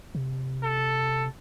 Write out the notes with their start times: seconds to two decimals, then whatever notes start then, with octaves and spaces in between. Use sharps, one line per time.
0.15 C3
0.63 A4